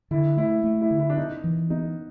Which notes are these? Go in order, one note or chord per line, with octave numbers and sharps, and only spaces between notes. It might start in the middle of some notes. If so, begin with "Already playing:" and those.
D3 E4
A3 E4
A3
E4
D3
E4
D4
B3 D#4
E3
B3 D#4